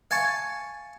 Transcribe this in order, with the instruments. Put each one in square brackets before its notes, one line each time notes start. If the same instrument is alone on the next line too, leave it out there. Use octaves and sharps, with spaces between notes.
[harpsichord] F5 G#5 A5 C#6